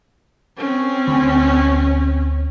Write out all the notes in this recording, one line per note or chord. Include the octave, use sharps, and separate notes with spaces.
C4 C#4
D2